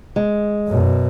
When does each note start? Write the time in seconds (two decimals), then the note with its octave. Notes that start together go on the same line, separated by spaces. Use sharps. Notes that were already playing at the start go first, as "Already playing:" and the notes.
0.16 G#3
0.68 F#2 B2